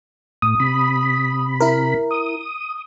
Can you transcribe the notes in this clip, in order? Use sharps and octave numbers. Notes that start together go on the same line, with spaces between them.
A2 D#6
C3 B5
E4 A#4
D#6